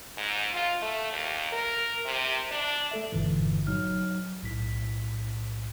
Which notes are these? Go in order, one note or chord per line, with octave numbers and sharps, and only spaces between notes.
G#2
F4
A3
D#2
A#4
C3
D4
A3 A4 E5
G1 G2 A#2 D3 E3
F#3 D#4 F6
B1 A2 B6